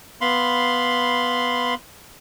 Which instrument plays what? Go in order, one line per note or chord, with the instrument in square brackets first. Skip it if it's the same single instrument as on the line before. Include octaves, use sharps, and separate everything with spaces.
[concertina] B3 F5 B5 C6